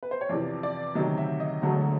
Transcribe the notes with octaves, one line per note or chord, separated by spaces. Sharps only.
B4
C5
C#5
F2 C3 E3 D5
D5
D2 C3 D#3 F#3 D#5
E5
D#5
E1 D2 D3 F#3 A3